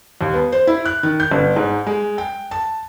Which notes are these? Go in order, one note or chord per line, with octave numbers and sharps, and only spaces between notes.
D#2
B3
C5
E4
F#6
D#3
G6
G1
G#2
G#3
G5
A5